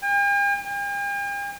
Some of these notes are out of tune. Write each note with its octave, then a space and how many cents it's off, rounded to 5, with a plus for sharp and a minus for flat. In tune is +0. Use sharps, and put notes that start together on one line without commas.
G5 +45
G5 +45